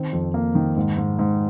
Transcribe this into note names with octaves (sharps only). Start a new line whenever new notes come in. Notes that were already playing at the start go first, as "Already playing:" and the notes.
Already playing: D#3 C4
F2
A#3
D#3
G#2
G#2
G#2